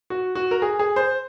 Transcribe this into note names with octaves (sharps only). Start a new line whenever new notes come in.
F#4
F#4
A#4
G#4
G#4
C5